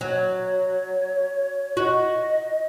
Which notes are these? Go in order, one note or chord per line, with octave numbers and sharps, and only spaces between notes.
F#3 C#5
F#4 D#5